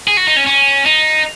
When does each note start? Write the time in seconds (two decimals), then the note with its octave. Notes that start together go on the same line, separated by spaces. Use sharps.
0.08 G#4
0.17 F#4
0.27 D#4
0.36 C#4
0.47 C#4
0.86 D#4